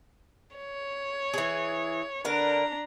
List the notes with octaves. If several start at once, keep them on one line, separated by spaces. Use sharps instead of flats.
C#5
E3 G#4
D3 D4 A#4 B4 A#5